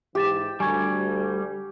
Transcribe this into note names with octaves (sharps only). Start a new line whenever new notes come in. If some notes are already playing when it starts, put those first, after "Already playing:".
G#2 E3 G4 D6 A6 E7
D2 G3 G#5 C#6 G#6